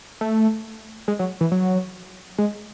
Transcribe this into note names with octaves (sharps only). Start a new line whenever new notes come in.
A3
G#3
F#3
E3
F#3
G#3